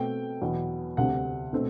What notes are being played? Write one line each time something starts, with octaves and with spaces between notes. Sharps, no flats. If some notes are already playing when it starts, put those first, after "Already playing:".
Already playing: B2 A3 C4 G5
E2 B2 F#3 B3
D2 C3 G3 C4 F#5
B2 A3 C4